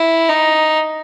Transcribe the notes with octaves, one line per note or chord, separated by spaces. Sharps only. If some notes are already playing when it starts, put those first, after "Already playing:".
Already playing: E4
D#4